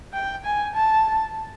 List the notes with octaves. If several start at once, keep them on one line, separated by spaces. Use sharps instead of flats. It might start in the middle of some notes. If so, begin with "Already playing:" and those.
G5
G#5
A5